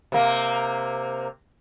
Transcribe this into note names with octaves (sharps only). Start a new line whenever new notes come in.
C3 A#3